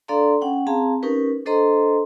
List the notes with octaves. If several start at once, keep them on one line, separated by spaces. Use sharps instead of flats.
D4 A4 D5 F5 A#5 C6
C#4 F#5 G5
C4 G#4 F5 A5 A#5
C#4 D#4 G4 A#4 B4
D4 A4 C5 D#5 A#5 C6